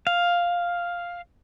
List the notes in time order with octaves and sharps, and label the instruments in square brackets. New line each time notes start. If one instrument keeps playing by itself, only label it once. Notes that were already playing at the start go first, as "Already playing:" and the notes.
[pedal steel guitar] F5